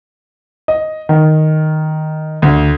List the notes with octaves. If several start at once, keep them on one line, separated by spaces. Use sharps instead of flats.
D#5
D#3
D2